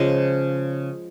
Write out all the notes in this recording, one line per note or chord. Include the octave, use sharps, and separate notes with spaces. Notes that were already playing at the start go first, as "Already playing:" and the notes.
Already playing: C#3 F3 G#3